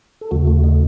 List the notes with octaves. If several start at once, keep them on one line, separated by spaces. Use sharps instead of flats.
A4
D#2 C#3 A3 F#4
F#4
D#5